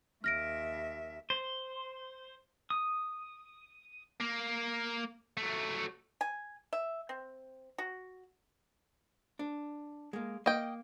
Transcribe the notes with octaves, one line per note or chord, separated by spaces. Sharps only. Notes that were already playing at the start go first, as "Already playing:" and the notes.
D#2 E5 F6 A#6 D7
C5
D#6
A#3
F#3 A3
G#5
E5
C4
F#4
D4
G#3 A#3
A#3 D#5 G5